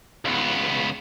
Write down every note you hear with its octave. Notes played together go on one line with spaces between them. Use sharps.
C#2 B3